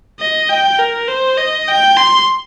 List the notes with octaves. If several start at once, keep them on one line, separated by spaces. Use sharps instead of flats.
D#5
G5
A#4
C5
D#5
G5
C6